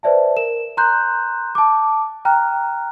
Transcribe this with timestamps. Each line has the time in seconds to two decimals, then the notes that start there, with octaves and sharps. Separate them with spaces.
0.03 B4 C5 D5 E5 A5
0.36 A#4 E7
0.77 A#5 C6 F#6 G6
1.55 A5 D6
2.25 G5 A#5 F6 F#6